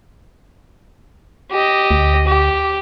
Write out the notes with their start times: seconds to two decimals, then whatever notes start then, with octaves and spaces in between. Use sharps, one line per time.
1.51 G4 D#5
1.91 D2
2.27 G4